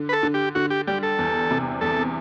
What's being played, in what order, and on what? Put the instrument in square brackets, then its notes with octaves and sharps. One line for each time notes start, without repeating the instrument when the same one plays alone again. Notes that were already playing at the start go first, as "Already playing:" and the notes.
Already playing: [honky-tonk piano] D3
[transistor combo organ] B4
A4
[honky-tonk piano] D3
[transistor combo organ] G4
[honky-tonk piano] D3 [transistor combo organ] F#4
[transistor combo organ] G4
[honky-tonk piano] G3 [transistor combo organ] G4
[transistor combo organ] A4
[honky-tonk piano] E2
C3
[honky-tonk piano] E2 [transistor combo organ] A4